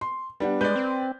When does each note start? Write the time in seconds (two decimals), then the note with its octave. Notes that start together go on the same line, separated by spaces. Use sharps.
0.01 C6
0.40 G3 B3 D4 F#5
0.61 G#3 B4 D5 G6
0.76 C4